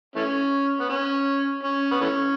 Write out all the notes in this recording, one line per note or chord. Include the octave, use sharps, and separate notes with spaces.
E3 A3 C#4
B3
C#4
C#4
B3
E3 A3 C#4